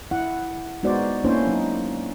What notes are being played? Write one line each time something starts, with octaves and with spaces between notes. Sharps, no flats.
E4 F#5
G#3 B3 D#4 F#4 C5 D5
A#3 C#4 D4 E4 C5 C#5
F#3 D#4